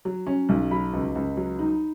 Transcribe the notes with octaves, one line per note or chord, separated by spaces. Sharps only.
F#3
C#4
B1
F#3 B5
C#2
C#2
F#3
D#4